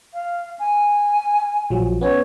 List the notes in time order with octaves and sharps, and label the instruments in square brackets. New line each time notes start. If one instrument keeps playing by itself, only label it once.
[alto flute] F5
G#5
[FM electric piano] A#1 F3 F#3
[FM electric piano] B3 C#4 [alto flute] C#5